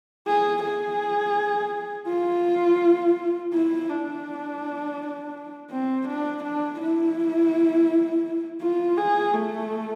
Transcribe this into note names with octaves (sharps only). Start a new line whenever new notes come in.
G#4
G#4
F4
E4
D4
C4
D4
D4
E4
F4
G#4
A3